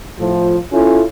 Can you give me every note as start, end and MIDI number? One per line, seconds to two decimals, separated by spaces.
0.19 0.55 45
0.19 0.55 53
0.73 1.01 61
0.73 1.01 64
0.73 1.01 65
0.73 1.01 69